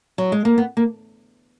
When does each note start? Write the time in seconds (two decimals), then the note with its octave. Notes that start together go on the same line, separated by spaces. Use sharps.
0.18 F#3
0.32 G#3
0.45 A#3
0.58 B3
0.77 A#3